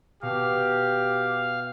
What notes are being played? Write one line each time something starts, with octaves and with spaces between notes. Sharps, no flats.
B2 G4 F5